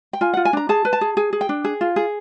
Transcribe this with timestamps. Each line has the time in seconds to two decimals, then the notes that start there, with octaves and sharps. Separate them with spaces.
0.13 G5
0.21 F4 G#5
0.33 F#5
0.37 F4
0.45 G#5
0.53 D4 A#5
0.69 G#4 A5
0.85 B4
0.93 A5
1.01 G#4
1.17 G#4 G#5
1.33 G#4
1.41 G5
1.49 D4
1.64 G#4
1.81 F4
1.96 G#4